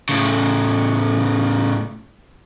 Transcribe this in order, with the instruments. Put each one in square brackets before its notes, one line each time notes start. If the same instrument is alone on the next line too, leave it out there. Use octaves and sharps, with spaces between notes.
[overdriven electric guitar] A2 C#3